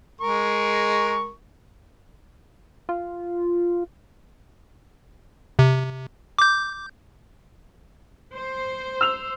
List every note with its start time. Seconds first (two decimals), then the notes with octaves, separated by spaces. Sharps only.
0.21 G#3 A#4 C#6
2.89 F4
5.59 C3
6.39 D6 G6
8.34 C5
9.01 E6 F7